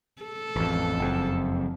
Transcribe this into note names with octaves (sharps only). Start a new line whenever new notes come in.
A4
A1 F2
F#1 F2